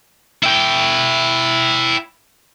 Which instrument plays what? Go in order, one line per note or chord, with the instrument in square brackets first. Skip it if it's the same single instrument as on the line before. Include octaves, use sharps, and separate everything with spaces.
[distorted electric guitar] E4 G5